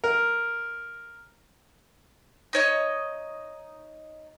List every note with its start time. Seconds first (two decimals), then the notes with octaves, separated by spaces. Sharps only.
0.04 A#4
2.53 D#4 C#5 D#5